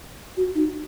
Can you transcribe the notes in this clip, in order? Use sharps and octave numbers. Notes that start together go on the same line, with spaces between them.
F#4
D#4